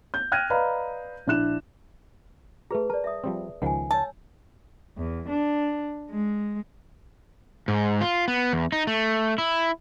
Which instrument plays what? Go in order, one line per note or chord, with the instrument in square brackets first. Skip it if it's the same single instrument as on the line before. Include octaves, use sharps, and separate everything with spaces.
[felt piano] G6
G5 F6 F#6 G#6 A#6 D#7
B4 D5 D#5 F5 A#5 B5
A#1 D4 E4 F#6 E7
[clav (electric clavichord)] A3 A#5 [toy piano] G#4 B4
[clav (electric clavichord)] A#4 [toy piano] D5 A5
[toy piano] E5 D#6
[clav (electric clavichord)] F3 G3 C4
[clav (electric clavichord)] C#2 D#3 F3 [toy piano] F#5 G#5
[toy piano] C#5 E6 [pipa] A5
[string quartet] E2
D4
G#3
[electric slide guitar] G#2
F4
B3
E2
D#4
A3
E4